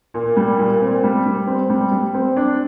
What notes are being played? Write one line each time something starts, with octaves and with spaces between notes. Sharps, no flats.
A#2
G3
A#2
C4
G3
G3
C4
G3
G3
C4
D4